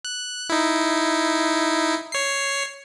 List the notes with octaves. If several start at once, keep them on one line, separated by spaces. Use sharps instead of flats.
F#6
D#4 E4
C#5 C7